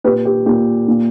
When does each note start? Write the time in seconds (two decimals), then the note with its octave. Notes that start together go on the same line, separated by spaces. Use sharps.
0.04 A#2 G4 B4
0.25 G4
0.46 A#2 G4
0.88 A#2